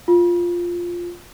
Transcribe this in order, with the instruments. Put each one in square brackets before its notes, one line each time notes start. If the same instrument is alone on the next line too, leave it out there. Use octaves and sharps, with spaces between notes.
[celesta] F4